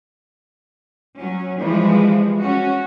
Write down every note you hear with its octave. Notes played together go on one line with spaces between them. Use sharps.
F#3 C#4
E3 F3 G3 G#3
C#4 F#4